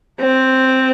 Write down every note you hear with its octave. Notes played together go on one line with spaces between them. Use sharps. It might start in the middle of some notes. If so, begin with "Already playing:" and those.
C4